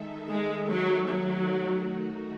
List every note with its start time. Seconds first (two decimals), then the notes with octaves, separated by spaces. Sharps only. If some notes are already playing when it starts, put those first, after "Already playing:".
Already playing: D#3 G#3 D#4 A4 E5
0.30 G#3
0.69 F#3
1.10 D#3 F#3 A3 D#4 F#4